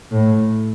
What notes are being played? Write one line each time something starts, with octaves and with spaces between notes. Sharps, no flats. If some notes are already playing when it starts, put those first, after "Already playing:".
A2